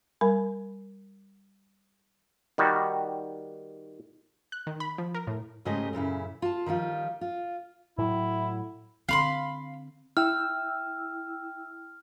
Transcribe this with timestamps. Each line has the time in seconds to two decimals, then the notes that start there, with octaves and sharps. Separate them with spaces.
0.21 G3 A#4 G#5 B5
2.58 D#3 G3 F#4
4.52 F#6
4.67 D#3
4.80 B5
4.98 F3
5.14 A#4
5.27 A2
5.65 G#2 C#3 G#3 A3 G4 D#5
5.93 F#2 A#2 C#3 E4
6.42 F4 A5
6.66 D#3 F3 G3 F4
7.21 F4
7.98 A2 F#3 E4
9.09 D3 C4 F5 B5 C6
10.17 E4 G5 E6 F6